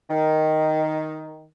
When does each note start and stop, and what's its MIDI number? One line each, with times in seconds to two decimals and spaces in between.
0.09 1.43 51